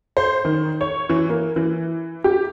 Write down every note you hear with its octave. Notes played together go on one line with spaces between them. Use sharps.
C5
D#3
C#5
E3
A#3
E3
G4